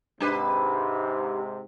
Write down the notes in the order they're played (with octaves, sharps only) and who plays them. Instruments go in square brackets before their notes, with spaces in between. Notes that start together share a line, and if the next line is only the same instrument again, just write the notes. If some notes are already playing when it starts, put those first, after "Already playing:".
[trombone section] G#2 C3 [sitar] D4 G4 B4